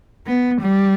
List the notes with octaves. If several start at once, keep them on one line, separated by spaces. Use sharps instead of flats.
B3
G3